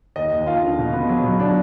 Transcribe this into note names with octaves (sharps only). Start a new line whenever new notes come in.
D#2 D#5
D#2
D#2 F4 F5
D3
B2
B3
F#3
B2
D4